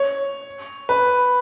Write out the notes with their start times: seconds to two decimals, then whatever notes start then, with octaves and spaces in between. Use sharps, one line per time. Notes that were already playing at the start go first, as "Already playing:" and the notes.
Already playing: C#5
0.89 B4